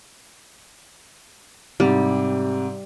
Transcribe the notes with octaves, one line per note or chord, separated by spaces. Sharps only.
G#2 C3 G3